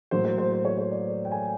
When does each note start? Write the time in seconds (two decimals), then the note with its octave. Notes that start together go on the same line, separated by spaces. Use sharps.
0.11 A2 F#3 A#3 C5
0.25 C5
0.38 C5
0.52 C5
0.65 C#5
0.78 C#5
0.91 D5
1.25 G5
1.31 G#5